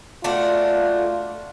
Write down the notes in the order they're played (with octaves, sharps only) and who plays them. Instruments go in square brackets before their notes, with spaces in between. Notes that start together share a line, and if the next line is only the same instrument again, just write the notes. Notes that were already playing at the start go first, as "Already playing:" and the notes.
[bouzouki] A3 D4 F#4 [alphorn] F4